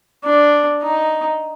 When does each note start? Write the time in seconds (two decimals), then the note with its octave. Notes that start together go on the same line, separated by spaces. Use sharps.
0.24 D4
0.83 D#4